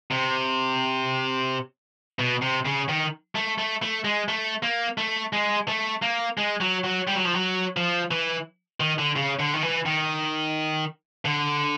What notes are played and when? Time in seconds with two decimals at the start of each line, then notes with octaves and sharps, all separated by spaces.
0.11 C3
2.19 B2
2.42 C3
2.65 C#3
2.89 D#3
3.35 A3
3.58 A3
3.82 A3
4.05 G#3
4.28 A3
4.63 A#3
4.98 A3
5.33 G#3
5.68 A3
6.02 A#3
6.38 G#3
6.61 F#3
6.84 F#3
7.07 G3
7.16 F#3
7.25 F3
7.35 F#3
7.77 F3
8.11 E3
8.80 D#3
8.99 D3
9.16 C#3
9.39 D3
9.53 D#3
9.63 E3
9.86 D#3
11.25 D3